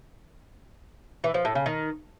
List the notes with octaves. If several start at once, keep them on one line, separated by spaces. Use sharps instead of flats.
E3
F3
A2
C#3
D#3